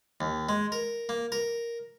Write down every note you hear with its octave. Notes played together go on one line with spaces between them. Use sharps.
D#2
G#3
A#4
A#3
A#4